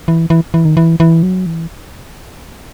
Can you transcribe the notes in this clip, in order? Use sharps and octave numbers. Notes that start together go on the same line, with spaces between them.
E3
E3
E3
D#3
E3
E3
F#3
E3